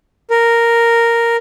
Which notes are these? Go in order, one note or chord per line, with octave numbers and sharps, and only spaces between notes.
A#4